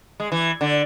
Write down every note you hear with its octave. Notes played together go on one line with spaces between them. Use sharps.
G#3
E3
D3